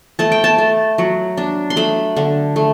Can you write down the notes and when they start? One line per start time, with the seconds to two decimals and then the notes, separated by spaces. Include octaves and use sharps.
0.19 A3 A5
0.32 G5
0.44 A5
0.58 A3
0.98 F#3
1.37 D4
1.70 C6
1.76 A3 B5
2.17 D3
2.56 A3